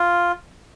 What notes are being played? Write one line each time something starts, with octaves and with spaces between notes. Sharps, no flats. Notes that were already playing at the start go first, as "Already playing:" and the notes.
Already playing: F4